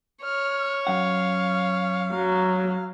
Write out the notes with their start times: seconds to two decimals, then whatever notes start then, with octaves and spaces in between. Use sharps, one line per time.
0.24 C#5 F6
0.87 F#2 F5 F#5
2.14 F#3